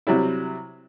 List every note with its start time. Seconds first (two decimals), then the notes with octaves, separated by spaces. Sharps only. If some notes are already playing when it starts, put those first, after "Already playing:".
0.07 C3 F#3 G3 E4